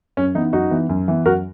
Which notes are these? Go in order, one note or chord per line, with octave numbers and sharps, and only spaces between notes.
F#2 C#4
E3 B3 D#4
F#2 D#4 F#4
E3 B3
F#2
E3 B3
F#2 F#4 A#4